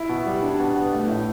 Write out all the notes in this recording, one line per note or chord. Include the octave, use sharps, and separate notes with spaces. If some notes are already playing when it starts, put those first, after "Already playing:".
Already playing: E4
B2
G3
D4
B2
B3
A3
A2